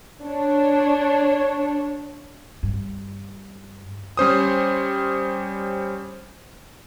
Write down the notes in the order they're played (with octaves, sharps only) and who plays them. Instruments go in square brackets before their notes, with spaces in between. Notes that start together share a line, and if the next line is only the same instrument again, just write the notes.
[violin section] D4 C#5
[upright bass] G2
[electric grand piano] G3 C#4 C5 D#6